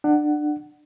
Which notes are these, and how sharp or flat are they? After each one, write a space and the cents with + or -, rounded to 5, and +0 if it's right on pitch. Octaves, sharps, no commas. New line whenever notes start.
D4 +25 F#5 +10